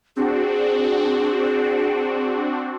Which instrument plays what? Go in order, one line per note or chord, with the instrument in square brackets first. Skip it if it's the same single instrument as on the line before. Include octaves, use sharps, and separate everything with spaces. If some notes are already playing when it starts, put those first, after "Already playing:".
[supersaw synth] C4 D4 F#4 [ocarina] G#4